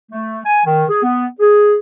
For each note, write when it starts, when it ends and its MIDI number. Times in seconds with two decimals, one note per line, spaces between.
0.12 0.39 57
0.46 0.61 80
0.65 0.84 51
0.89 1.01 68
1.03 1.26 59
1.40 1.76 68